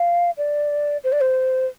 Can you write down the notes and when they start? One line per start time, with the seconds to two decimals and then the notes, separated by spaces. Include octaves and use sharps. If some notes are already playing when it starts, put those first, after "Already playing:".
Already playing: F5
0.37 D5
1.04 C5
1.12 D5
1.21 C5